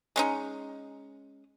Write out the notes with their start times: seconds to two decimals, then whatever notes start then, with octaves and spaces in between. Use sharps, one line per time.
0.16 G#3 C#4 D#4